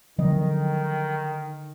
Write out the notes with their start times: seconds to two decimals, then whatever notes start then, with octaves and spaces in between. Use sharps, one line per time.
0.18 D3 D#3 F3 F#3 B3 D#5